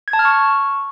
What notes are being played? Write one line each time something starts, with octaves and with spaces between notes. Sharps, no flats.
G#6
A5
F6
C#6